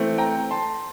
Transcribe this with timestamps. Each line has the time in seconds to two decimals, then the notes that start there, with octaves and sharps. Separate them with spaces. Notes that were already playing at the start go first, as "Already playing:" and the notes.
Already playing: E3 A3 C4
0.18 G5 A#5
0.51 A5 C6